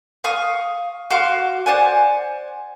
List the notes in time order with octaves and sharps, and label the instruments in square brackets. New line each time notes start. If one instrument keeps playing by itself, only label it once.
[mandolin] F5 C#6 D#6
F#4 F5 C6 D6
C5 D5 F#5 G#5